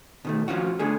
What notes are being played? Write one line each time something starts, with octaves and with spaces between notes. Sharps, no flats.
B2 D#3 A3
F3 C#4 F4 F#4
D3 A3 G#4